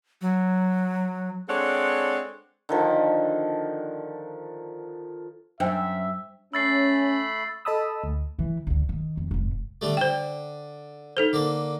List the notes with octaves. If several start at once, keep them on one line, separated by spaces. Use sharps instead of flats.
F#3
G#3 C4 D4 A4 C#5 F#5
D3 D#3 F3
F#2 D4 C5 E5 G5
A3 C#4 B5 E6 A6 C7
A4 D#5 A5 B5 D#6 E6
D2
E3
D2 D3
D#3
F2
F1 G#2
D3 G3 A3
D3 C5 G5
D#4 A4 C5
D3 A#3